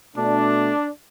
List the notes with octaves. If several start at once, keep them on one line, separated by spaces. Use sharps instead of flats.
B2 A3 D4